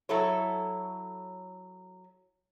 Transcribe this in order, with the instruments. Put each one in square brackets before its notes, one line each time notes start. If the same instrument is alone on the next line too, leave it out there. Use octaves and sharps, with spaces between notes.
[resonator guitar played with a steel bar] F#3 E4 A4 C#5